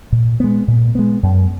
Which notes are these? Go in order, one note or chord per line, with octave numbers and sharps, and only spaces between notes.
A#2
G#3 B3
A#2
G#3 B3
F#2